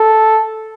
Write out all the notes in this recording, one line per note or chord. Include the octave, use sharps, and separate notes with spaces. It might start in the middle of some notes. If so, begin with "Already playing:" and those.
Already playing: A4